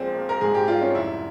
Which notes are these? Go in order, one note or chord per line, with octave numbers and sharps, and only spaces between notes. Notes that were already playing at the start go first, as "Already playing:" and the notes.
Already playing: A#1 A#2 G#3 C4
A#3
A#4
G#2 G#4
G4
G3 F4
C#4
F1 E4